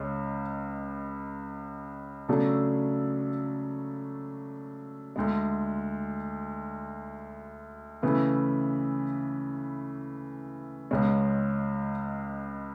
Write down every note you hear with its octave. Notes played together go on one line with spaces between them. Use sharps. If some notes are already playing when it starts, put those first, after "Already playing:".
Already playing: C#2 C#3 G#3 C#4
C#3 F#3 A3 D4 A4
D2 D3 G#3
C#3 E3 A3 E4 B4
C#2 C#3 G#3 C#4